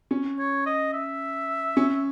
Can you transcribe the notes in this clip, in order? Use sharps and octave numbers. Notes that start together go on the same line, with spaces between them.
C#4
C#5
D#5
E5
C#4